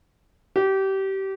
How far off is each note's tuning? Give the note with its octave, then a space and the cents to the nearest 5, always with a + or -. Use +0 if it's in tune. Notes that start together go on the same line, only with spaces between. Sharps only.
G4 -25